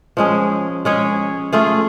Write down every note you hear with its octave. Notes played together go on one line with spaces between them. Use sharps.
F3 G#3 C#4 G#4
G#3 C#4 G#4 C#5
A3 F4 G#4